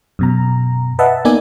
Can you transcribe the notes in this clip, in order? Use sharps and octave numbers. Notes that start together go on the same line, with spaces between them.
F#2 B2 A#5
B4 D#5 E5 F#5 A5
A#3 B3 D#4 A#4 D5 G#5